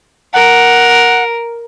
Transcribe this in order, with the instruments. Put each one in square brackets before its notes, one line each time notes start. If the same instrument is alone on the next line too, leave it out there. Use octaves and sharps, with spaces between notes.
[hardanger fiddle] A#4 [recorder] F#5